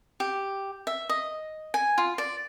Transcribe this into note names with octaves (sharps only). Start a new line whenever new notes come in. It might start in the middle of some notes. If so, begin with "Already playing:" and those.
G4
E5
D#5
G#5
F4
D5